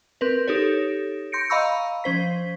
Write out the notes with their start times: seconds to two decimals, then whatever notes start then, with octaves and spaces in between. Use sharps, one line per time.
0.21 C4 A#4 B4
0.47 D#4 G4 A4 C#5
1.32 C6 G6 A#6 C#7 D7
1.50 D#5 F5 A#5 B5 C#6 E6
2.04 F3 C#4 C5 B6